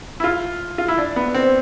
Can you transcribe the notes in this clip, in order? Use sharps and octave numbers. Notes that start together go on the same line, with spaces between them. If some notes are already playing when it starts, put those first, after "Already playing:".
E4
F4
F4
E4
D4
B3
C4